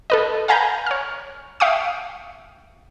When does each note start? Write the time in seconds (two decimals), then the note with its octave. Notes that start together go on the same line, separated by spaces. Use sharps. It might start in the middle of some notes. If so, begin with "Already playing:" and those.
0.10 A4 B4 D#5
0.48 F5 F#5 G#5 A#5 B5 G6
0.86 C#5 F6
1.60 E5 F5 G5 C#6 D#6